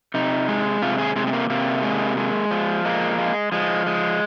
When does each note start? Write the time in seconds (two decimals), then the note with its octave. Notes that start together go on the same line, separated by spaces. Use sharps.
0.14 C3 D#4
0.49 G#3
0.82 C3 F4
0.98 G#4
1.16 C3 G#3
1.27 G#3
1.33 A#3
1.50 C3 A#3
1.83 G#3
2.17 G#3
2.51 F3
2.85 G#3 A#3
3.18 G#3
3.52 F3 G#3
3.86 G#3